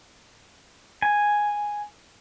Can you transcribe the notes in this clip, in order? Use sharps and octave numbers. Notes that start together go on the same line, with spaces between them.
G#5